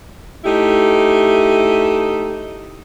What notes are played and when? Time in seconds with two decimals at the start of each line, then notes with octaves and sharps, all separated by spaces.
0.44 A3 D#4 E4 G4